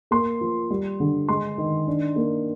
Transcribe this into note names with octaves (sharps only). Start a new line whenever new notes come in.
A#3 C6
F3
G3
D3
G#3 C6
D#3
D4
A#3